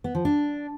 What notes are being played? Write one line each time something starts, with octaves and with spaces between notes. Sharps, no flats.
B3
F3
D4